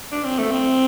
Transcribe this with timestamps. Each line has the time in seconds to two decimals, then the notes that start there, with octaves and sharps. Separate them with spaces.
0.12 D4
0.25 C4
0.39 A3
0.51 C4